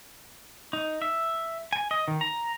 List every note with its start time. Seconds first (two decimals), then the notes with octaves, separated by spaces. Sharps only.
0.73 D#4
1.02 E5
1.73 G#5
1.91 D#5
2.08 D#3
2.21 A#5